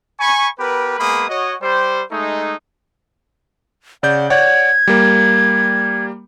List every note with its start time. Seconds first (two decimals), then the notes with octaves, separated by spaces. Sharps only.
0.20 G#5 B5 C#6
0.58 B3 G4 A#4 B4
0.99 G#3 A#3 B3 G#4 B5 D#6
1.29 F#4 C#5 D#5
1.61 G3 C5
2.11 G#3 A3 D#4
4.03 C#3 D5 F#5 G6
4.30 C#5 D5 F#5 G#6
4.87 G3 A#3